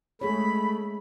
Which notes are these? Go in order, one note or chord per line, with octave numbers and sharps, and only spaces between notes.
G#3 A3 G#4 C#5 B5